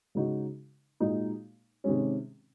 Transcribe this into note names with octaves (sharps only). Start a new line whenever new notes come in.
C#3 G#3 D#4 F#4
A#2 G#3 D#4 F#4
C3 D#3 G#3 C#4